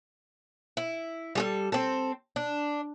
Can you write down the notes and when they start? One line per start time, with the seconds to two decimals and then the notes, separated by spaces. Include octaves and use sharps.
0.77 E4
1.35 G3 G#4 A4
1.72 C4 A4
2.36 D4